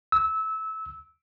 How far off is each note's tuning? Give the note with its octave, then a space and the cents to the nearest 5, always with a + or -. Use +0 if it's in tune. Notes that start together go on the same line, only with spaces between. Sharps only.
E6 -20